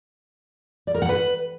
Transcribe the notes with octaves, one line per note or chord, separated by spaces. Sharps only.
D5
A#4
F#5
B4